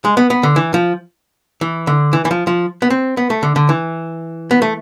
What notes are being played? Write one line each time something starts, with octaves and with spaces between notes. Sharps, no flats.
G#3
B3
B3
D3
E3
F3
E3
D3
E3
E3
F3
F3
B3
C4
B3
A3
D3
D3
E3
B3
A3